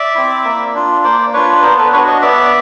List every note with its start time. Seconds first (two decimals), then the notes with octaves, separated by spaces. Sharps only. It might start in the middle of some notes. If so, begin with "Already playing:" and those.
Already playing: D5 E5
0.15 C4 E4
0.45 A#3
0.75 D4 F4
1.04 A#3 C5 D5
1.33 D4 F4 B4 C#5
1.55 B4
1.63 B3 A#4 C5
1.78 A4 B4
1.93 D4 F#4 B4 C#5
2.07 C#5 D#5
2.22 B3 D5 E5